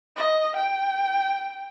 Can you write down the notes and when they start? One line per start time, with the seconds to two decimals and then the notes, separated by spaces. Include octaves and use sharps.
0.16 D#5
0.56 G5